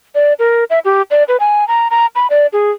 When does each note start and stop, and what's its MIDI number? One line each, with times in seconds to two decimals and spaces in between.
0.15 0.33 74
0.39 0.64 70
0.70 0.79 76
0.85 1.02 67
1.11 1.23 74
1.28 1.37 71
1.40 1.67 80
1.68 1.88 82
1.91 2.06 82
2.15 2.27 83
2.30 2.47 74
2.53 2.71 68